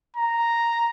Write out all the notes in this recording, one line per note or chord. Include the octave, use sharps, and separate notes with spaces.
A#5